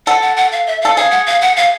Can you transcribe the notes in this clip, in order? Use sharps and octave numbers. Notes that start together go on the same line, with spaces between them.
A4 F#5
F#5
F#5
F5
E5
A4 F5
G#4 F5
F#5
F5
F#5
F5